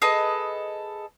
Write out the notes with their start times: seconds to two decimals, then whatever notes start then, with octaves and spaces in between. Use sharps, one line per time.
0.02 G#4 A4 B4 D#5